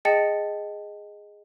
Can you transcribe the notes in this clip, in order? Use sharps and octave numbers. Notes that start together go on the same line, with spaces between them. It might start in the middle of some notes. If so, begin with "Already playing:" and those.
G#4 D#5 G5 A5 A6 C#7